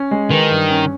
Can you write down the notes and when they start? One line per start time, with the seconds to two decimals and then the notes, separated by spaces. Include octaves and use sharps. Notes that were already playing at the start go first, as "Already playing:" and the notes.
Already playing: C#4
0.11 G#3
0.31 D#3 E3
0.51 G2
0.71 C#4